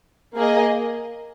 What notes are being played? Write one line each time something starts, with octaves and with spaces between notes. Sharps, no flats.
A#3 G#4 D#5